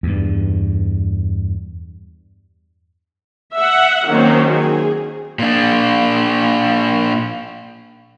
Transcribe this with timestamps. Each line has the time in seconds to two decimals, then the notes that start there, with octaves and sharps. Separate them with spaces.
0.03 E2 G2
3.53 E5 F#5
4.07 D#3 F#3 A#3 C4 C#4
4.52 G#4
5.39 A#2 D4